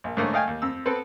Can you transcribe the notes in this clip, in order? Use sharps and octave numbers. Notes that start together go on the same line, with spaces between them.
A#1
G#2 D3 A3 A#3 C#4
A3 D#5 F5 G5 G#5
D#2
F2 E6
B3 C4 A4 B4